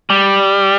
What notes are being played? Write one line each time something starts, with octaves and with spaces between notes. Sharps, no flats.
G3